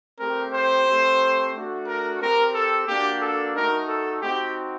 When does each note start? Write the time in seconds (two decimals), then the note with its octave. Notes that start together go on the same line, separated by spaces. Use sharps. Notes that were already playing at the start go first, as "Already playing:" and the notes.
0.20 A3 C4 G4 A#4
0.53 C5
0.87 A3 C4 G4
1.55 A3 D4 F#4
1.87 A#4
2.21 C4 G4 A#4
2.55 A4
2.87 A#3 D4 F#4 G4
3.22 A4
3.55 A3 D#4 F#4 A#4
3.88 A4
4.21 C4 D#4 F#4 G4